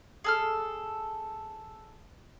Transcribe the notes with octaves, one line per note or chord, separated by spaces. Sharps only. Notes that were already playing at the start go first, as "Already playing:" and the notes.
G#4 A4 F6